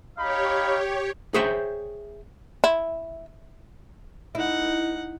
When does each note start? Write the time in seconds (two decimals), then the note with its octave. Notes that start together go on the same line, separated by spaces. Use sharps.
0.17 D#4 G4 C#5 F5 B5
1.34 G#4 C5 C#5 E5 G5
2.64 E4
4.35 D#4 E4 F#5